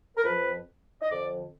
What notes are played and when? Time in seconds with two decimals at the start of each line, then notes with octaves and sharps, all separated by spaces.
0.17 A#4
0.24 F2 F3 B4
1.02 D#5
1.11 F2 D3 F3 D5